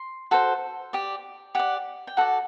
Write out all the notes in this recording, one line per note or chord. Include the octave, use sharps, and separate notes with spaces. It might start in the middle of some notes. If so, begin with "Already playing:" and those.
Already playing: C6
F#4 A4 C5
G4 D5
G4 D5 F#5
G5
F#4 A4 D5 F#5